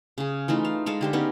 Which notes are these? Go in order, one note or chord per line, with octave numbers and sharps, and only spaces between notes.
C#3 G#4
E3 A3 D#4 F4
F5
G#3 A4 F5
D3 G4 C5
B3 C#4 D#4